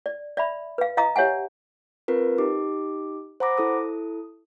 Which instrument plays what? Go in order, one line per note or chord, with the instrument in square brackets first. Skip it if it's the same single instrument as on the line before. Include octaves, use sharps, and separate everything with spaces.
[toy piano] D5
D5 E5 B5
B4 F5
D#5 F5 A#5 D#6
G4 C#5 E5 F#5 G#5
[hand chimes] C4 F4 A#4 B4
D#4 G4 D6
C5 F#5 A#5 B5 D6 A#6
E4 A4 D#6